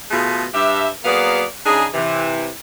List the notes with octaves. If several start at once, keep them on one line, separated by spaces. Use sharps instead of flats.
B2 A3 F4 G#4
G2 G4 E5
F#3 A#3 B3 G#4 D5 F5
C#3 D4 D#4 G#4
C3 E3